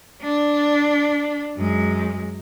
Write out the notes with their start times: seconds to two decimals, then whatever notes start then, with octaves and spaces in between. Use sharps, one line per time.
0.22 D4
1.56 F#2 G#3